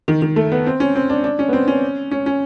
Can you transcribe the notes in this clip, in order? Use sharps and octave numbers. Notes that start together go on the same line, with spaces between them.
D#3
D#3
A3
B3
C4
C#4
C4
D4
D4
C#4
B3
C4
C#4
C#4
C#4